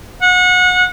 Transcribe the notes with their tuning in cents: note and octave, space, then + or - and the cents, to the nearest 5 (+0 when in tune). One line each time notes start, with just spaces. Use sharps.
F#5 -30